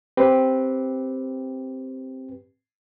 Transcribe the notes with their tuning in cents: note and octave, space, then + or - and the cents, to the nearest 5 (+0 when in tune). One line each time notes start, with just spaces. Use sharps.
C4 +0 G4 +0 B4 +0